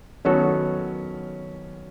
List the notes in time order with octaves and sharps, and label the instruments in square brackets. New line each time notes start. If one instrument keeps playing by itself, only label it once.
[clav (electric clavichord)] D#3 F#3 B3 F#4 A4 [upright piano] C#4